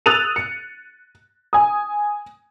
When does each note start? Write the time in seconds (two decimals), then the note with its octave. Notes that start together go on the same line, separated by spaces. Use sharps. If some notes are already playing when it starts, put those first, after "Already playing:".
0.06 D#6 E6 F#6 A6 D#7 F7
0.36 C#7
1.53 G#5 D#6